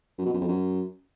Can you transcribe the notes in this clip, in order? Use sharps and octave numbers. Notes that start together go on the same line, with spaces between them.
F#2
B2
F#2
F2
F#2